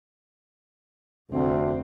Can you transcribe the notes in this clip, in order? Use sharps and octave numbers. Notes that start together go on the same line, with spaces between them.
F1 D2 C4